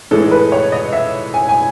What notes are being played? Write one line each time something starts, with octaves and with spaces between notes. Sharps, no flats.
A2 E3 G#3 A4
B4
C#5
D#5
E5
G#5
G#5